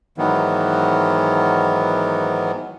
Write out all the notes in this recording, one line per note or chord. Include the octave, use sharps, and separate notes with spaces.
G#2 D#3 E3 F#3 B3